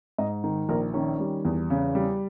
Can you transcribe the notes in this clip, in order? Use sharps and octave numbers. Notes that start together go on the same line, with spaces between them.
G#2 D#5
D#3
A#1 A#4
D#3 C#4
G3
E2
C#3
G3